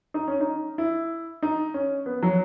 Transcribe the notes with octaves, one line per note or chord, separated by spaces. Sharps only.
D#4
C#4
D#4
E4
D#4
C#4
B3
F#3